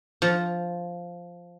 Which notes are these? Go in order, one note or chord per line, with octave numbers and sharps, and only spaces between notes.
F3